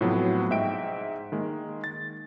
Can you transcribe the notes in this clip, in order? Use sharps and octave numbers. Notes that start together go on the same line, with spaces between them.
A2 C3 F3 F#3 B3
G#2 E5 G5 D7
D#3 G#3 A#3
A6